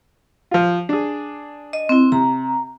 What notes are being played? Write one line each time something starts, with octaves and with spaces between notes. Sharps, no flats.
F3 F4
D4 G#4
D#5
C4 E4
C3 A#5